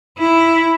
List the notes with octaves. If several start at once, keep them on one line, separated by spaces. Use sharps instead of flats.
E4